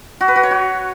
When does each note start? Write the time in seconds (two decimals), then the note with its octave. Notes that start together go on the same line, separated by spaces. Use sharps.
0.21 F#4
0.28 B4
0.36 F#4
0.43 C#5
0.51 F#4